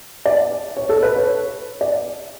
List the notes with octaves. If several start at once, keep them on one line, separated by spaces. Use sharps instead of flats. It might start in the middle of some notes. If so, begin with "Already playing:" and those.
D5
C#5
A4
B4
C#5
D5